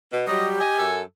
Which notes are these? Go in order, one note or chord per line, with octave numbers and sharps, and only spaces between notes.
B2
F#3 G3 G4 D#5
D#5 G#5
F#2 A4